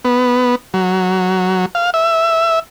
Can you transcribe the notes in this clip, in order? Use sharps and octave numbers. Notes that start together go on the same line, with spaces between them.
B3
F#3
F5
E5